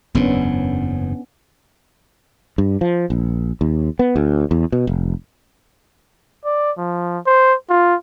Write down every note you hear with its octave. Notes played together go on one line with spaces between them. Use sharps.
F#1 E2 G#2 B3 C#4 D4
G2
F3
A#1
D#2
B3
D2
E2
B2
F1
D5
F3
C5
F4